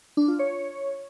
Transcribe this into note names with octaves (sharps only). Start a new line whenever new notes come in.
D4
F4
C#5